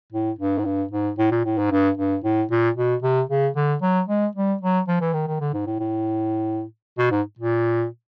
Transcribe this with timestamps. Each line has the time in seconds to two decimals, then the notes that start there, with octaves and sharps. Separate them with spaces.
0.12 A2
0.38 G2
0.58 G#2
0.65 G2
0.91 G#2
1.18 A2
1.31 A#2
1.45 A2
1.58 G#2
1.71 G2
1.97 G2
2.24 A2
2.51 A#2
2.77 B2
3.03 C3
3.29 C#3
3.56 D3
3.82 F#3
4.08 G#3
4.35 G3
4.61 F#3
4.88 F3
5.01 E3
5.13 D#3
5.27 D#3
5.41 D3
5.53 G#2
5.67 A2
5.79 A2
6.98 B2
7.12 G#2
7.39 A#2